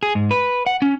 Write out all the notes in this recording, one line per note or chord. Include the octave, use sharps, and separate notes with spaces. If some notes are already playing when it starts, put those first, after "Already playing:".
G#4
G#2
B4
F#5
C#4